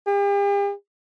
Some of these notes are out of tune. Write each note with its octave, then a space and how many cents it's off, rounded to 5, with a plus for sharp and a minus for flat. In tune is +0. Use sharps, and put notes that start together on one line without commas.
G4 +45